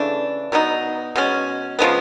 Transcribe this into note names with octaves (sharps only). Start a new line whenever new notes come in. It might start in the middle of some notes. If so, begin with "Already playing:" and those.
Already playing: C#3 E3 A3 D4
B2 F#3 B3 D#4
B2 G#3 C#4
C#3 F3 G#3 B3